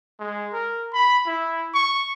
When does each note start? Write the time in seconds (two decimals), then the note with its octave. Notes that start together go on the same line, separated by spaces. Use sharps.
0.20 G#3
0.53 A#4
0.93 B5
1.26 E4
1.74 C#6